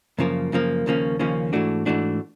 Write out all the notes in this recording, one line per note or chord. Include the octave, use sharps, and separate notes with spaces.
F#2 C#3 F3 A#3
F#2 C#3 F3 A#3
D#2 C#3 F3 A#3 C#4
D#2 C#3 F3 A#3 C#4
G#2 E3 A3 D4 F#4
G#2 E3 A3 D4 F#4